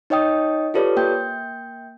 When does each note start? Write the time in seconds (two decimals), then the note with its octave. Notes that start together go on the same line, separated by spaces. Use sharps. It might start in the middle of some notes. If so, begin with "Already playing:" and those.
0.10 D#4 C#5 D#5 G5 D#6
0.74 F4 G4 A4 B4 C#5 D5
0.97 A#3 G5 G6